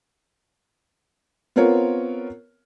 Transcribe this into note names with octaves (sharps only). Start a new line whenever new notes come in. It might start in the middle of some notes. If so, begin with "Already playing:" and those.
B3 C4 F4 A#4 C#5